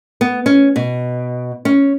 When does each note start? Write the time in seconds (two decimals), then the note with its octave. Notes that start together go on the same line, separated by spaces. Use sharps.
0.21 B3
0.46 C#4
0.76 B2
1.65 C#4